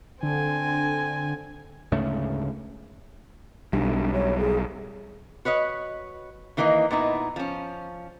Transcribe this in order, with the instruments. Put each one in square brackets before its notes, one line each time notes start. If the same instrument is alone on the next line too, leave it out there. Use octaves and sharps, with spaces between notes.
[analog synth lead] D3 [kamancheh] C4 G#5
[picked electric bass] D2 G#2 C#3 A3
[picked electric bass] B1 G3 [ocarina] D4
[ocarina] C#5
G#4
[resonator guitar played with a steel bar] F#4 B4 C#5 D#5
D#3 E3 A#3 B4 D#5
A#2 B3 D#4 E4
F3 C#4